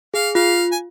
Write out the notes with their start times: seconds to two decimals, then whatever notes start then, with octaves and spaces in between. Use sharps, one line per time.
0.14 G#4 F5
0.35 F4 F5
0.72 G#5